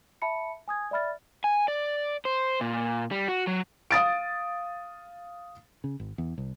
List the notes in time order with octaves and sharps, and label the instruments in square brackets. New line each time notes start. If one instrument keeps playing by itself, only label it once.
[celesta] E5 A5 B5 C#7
G#5 D#6 G#6
D5 E5 B5 F6 A6
[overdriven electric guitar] G#5
D5
C5
A#2
G3
F#4
F#3
[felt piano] F5 D#6 A6 D7
[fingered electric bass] C#3
G#1
E2
C2